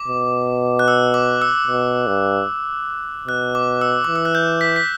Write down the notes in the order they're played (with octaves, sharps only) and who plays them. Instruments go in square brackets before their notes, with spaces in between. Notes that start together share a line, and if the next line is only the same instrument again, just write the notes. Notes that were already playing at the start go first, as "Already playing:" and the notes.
Already playing: [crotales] D6
[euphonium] B2
[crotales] F#6
E6
D6
E6
[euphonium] B2
G2
[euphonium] B2 [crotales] F#6
[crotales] D6
E6
[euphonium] E3 [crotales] D6
[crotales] E6
F#6
G6
B6
B6